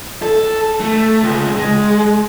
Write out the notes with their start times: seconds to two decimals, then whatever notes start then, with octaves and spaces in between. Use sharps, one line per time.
0.22 A4
0.81 A3
1.22 C#2
1.57 G#3